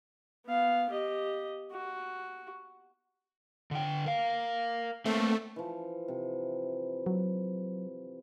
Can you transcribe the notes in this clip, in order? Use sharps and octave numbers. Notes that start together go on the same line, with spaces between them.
B3 F5
G4 D#5
F#4
D3 G5
A#4 F5
A3 A#3 C4
E3 F3
C3
F#3